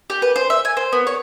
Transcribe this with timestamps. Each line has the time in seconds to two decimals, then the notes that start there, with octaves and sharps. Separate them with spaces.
0.10 G4
0.22 B4
0.36 C5
0.50 E5
0.65 G#5
0.77 C5
0.93 B3
1.07 C#5